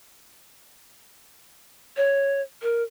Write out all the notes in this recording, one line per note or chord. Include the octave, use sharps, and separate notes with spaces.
C#5
A#4